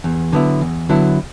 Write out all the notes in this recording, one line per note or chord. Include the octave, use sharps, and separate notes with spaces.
E2
D3 F#3 B3 E4
E2
D3 F#3 B3 E4